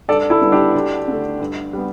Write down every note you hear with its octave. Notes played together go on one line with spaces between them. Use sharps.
G2 A4 D5
E4 A4
D3 G3 B3
D4 G4
D2
D3 A3
G2
G3 B3